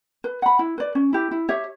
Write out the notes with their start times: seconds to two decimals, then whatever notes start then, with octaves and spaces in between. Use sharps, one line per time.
0.24 B4
0.42 F#5 B5
0.59 E4
0.78 B4 D5
0.95 C#4
1.13 E4 G4
1.31 E4
1.49 G4 C#5 E5